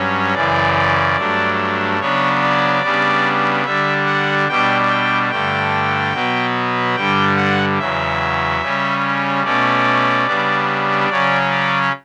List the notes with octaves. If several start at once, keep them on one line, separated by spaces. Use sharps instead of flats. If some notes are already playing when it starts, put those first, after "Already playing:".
Already playing: G2 F#3 C#4
F#2 C#3 E3 D5
G2 F#3 A3 D4
C#3 F#3 B3 D4 C#5
D5
C#3 G3 B3 D4
D3 G3 D4 E5
F#5
B2 G3 D4 G5
G5
G2 D3 A3 G5
B2 F#3 B3
G2 D3 G3 G5
F#5
E2 C#3 F#3 E5
C#3 G3 C#4
B2 A3 C#4 D5
C#3 G3 B3 D4
C#3 F#3 C#4 D5
D5